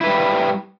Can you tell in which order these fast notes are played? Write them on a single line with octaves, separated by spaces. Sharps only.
E4 B4 G3